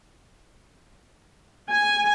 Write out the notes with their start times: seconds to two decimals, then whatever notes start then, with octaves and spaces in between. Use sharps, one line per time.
1.69 G#5